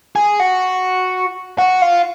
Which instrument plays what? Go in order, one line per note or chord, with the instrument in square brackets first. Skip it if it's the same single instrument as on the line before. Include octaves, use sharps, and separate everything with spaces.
[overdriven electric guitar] G#4
F#4
F#4
F4